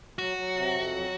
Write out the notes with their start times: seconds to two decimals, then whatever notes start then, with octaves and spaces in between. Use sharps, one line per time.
0.18 F#3 F#4
0.37 F#3
0.55 C3
0.75 F2
0.92 F#3